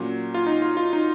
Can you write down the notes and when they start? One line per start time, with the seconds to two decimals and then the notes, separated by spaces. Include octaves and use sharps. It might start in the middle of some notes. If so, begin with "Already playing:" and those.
Already playing: A#2 F#3 C#4 F#4
0.34 F4
0.47 D#4
0.62 F4
0.77 F4
0.93 D#4